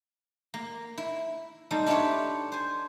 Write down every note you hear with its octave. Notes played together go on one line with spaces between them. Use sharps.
A#3
E4
G3 C4 D#4 A4
D4 E4 F4 G4 B4 C#5
C5 G#5